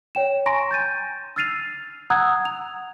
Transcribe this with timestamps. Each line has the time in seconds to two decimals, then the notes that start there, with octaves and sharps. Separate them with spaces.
0.15 C#5 G5 E7
0.46 G#5 A#5 C6 C#6 A#6 D7
0.71 G6 A6 D#7
1.36 E6 F6 A6 C7 D#7 F7
2.10 F#5 A#5 D#6 E6 F#6 G#6
2.45 F7